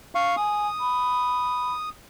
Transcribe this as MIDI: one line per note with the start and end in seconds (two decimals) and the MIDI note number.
0.15 0.36 77
0.15 0.36 85
0.37 0.68 80
0.37 1.89 87
0.80 1.73 83